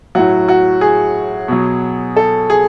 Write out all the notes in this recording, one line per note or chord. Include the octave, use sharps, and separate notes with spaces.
A2 F#3 F#4
F#4
G#4
B2 F#3
A4
G#4